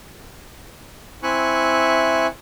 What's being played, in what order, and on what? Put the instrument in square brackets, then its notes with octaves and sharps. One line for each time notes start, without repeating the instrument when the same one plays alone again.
[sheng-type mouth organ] C4 E4 E5 G#5 C#6 F#6